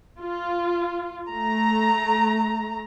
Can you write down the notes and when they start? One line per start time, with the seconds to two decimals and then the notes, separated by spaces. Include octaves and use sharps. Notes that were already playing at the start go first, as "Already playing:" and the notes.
0.21 F4
1.29 A3 A#5